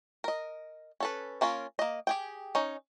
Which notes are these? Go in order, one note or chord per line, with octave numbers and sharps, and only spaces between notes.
A#4 D#5
C#4 A4 B4
A#3 C#4 F4 A#4
A#3 D#5
G4 G#4 G5
C#4 D#4